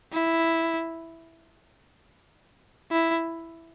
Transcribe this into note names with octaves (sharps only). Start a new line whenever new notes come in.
E4
E4